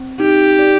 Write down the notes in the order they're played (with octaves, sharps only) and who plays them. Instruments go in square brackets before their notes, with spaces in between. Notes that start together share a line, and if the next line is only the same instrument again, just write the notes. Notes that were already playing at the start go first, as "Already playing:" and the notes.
Already playing: [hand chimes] C4
[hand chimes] D#4 [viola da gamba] G4
[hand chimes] D5